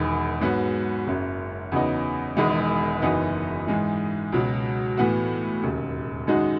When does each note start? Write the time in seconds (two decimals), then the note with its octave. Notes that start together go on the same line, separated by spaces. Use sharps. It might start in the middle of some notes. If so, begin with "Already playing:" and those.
Already playing: E1 E2 D#3
0.41 G#2 F#3 B3 F#4
1.07 F#1 F#2 C#3
1.72 E2 C#3 F#3 B3 D#4
2.37 E1 E2 D#3 G#3
3.02 F#1 F#2 E3 B3 D#4
3.67 G#2 E3 G#3 D#4
4.32 C#2 B2 F#3
4.97 A2 E3 B3 F#4
5.63 E1 D#2 C#3
6.27 F#2 D#3 G#3 D#4 F#4